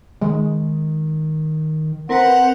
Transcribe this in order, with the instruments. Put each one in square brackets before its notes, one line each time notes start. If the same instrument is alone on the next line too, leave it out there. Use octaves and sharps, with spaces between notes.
[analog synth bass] D#3 [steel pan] G#3
[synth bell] C4 A#4 B4 [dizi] F#5